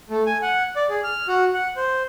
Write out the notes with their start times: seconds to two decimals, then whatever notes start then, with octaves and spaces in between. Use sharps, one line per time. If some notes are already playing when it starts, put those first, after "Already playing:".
0.10 A3
0.27 G#5
0.42 F#5
0.76 D5
0.89 G#4
1.04 F6
1.28 F#4
1.54 F#5
1.77 C5